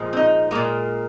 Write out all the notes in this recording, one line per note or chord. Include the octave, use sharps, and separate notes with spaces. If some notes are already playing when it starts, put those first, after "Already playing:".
Already playing: A#2 F3 G#3
C4
D#4
A#2 G#3 A#3